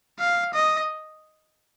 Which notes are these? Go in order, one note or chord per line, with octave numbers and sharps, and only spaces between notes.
F5
D#5